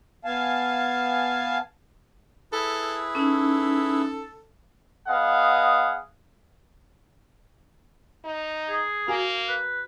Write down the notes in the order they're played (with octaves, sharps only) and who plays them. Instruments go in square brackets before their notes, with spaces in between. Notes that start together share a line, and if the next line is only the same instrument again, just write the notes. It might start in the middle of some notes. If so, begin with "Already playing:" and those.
[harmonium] B3 F5 G#5 A5
[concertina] E4 G#4 B4 [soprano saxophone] A4
[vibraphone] C#4 D#4 [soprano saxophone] A4
[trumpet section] B3 G#4 D#5 F5 F#5
[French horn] D#4
[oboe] G#4
[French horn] A#3 [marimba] F#4 G#5
[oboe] B4